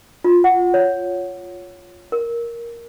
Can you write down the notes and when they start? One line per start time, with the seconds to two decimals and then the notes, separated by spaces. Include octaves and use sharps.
0.24 F4
0.44 F#5
0.74 C#5
2.12 A#4